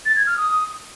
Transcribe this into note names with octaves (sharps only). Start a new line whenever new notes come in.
A6
G#6
F6
D#6